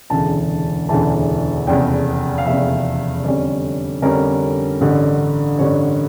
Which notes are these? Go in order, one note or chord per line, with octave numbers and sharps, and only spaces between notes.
E1 D2 C#3 E3 A5
E1 D2 C#3 E3 A5
F1 E2 C#3 G5
F5
F1 E2 C#3 E5
F2 D3 G3 C#4 D5
F2 D3 G3 C#4 A#4
A1 G2 D3
A1 G2 D3 C#5